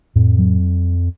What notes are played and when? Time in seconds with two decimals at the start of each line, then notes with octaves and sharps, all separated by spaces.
0.16 F2 A2
0.39 F#3